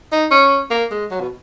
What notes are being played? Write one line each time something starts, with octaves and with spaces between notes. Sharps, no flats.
D#4
C#4
A#3
G#3
F#3
B2